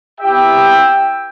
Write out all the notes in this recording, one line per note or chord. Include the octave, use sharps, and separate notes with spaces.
B3 E4 G4 E5 G5